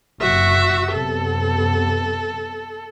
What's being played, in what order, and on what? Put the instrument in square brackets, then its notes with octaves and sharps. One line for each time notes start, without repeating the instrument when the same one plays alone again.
[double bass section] F#1 C3 [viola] F#4 E5
[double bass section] F#2 C3 B3 [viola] A4